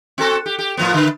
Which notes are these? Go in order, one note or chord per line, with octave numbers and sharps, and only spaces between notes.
C4 F#4 A4
G4
G4
A2 F3 B3
D3 B4